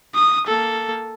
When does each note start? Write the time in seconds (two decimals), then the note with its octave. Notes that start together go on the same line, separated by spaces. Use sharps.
0.15 D#6
0.47 A#3 A4